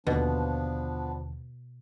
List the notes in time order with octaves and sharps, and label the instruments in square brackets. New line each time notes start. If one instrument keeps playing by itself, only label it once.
[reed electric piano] D#2 D3 [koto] B2 [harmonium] F3 B3 D4